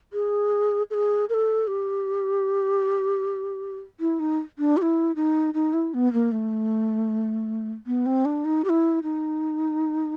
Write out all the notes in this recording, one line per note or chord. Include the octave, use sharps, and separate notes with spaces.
G#4
A4
G#4
A#4
A4
G4
E4
D#4
D4
G4
E4
D#4
D#4
E4
B3
A#3
A3
B3
C4
D4
D#4
G4
E4
D#4